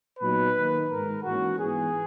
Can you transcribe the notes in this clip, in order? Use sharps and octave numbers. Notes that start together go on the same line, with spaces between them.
A#2 F#3 B3 D#4 B4
D#3 A#3 D#4
G#2 D#3 G#3 A#4
G#2 E3 A#3 C#4 F#4
G#2 E3 B3 G#4